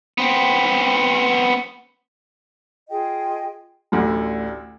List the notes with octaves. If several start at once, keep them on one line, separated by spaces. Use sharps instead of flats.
B3 C4
F4 G#4 D#5 G5
A1 D2 D3